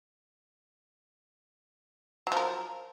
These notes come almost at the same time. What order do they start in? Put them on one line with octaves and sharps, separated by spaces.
F#3 F3 A#4